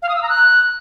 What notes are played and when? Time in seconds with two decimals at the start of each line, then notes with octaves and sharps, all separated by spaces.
0.02 F5
0.09 D#6
0.16 E6
0.22 A#5
0.29 F#6